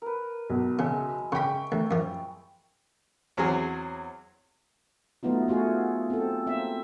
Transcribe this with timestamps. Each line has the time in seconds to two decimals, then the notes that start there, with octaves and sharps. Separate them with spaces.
0.02 A#4 B4
0.50 B1
0.79 C#3 G#3 E5
1.32 C#3 G5 B5 C#6
1.72 D2
1.91 F#2 F3
3.37 E2 F#3 C4 G#4
5.23 F#3 A3 B3 D#4 F4
5.48 A3 F4 F#4 G#4
6.10 C4 A4
6.47 A#3 C4 E5